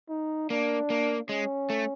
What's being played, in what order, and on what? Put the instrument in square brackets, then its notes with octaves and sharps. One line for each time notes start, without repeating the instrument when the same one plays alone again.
[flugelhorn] D#4
[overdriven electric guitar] A#3 [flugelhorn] D4
[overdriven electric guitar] A#3
[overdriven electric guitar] G#3 [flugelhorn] C#4
[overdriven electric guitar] A3